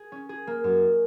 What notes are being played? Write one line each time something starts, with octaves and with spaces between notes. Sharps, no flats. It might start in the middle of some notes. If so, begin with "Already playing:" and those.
Already playing: G#4
C#4
G#4
A#3
F#2